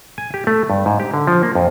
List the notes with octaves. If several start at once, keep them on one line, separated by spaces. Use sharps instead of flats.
G#5
G4
A3
G2
G#2
G4
D3
F3
A#3
F2